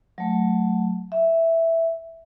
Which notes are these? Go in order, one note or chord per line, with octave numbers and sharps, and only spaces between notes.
F#3 A3
E5